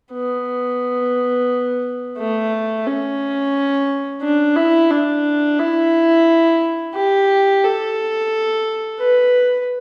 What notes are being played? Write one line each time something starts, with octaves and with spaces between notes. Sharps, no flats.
B3
A3
C#4
D4
E4
D4
E4
G4
A4
B4